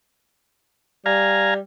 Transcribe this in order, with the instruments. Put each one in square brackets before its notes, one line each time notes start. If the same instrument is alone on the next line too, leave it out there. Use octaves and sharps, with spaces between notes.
[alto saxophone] G3 [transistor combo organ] F5 G#5 A#5